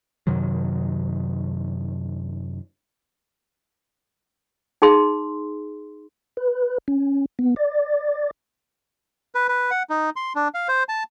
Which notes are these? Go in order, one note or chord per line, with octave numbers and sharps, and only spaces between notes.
F#2 C3 D#3 F#3
D#4 G#4 C6
B4
C#4
B3
D5
B4
B4
F#5
D#4
C6
D4
F5
C5
A5